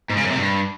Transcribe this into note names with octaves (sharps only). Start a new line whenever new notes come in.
G#2
C#3
F#2
C3
G2